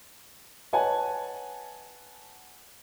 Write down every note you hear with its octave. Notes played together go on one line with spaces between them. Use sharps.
B4 C#5 D#5 F#5 G#5 A5